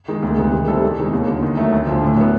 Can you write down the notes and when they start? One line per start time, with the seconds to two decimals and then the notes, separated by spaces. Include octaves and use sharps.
0.08 D#3 G#3
0.23 D2
0.38 C3 D#3 G#3 B3
0.53 D#3
0.67 G3 C4 E4 A4
0.82 E2
0.98 C3 D#3 G#3
1.13 D#2
1.28 D3 F#3
1.42 D#3
1.57 F#3 A3
1.72 D2
1.87 F3
1.92 D3
2.02 A2
2.17 F#3 B3